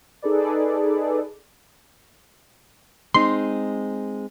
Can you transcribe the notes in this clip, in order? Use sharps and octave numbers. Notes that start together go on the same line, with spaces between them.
D#4 G#4 A4 B4 D5
G#3 C4 D#4 C6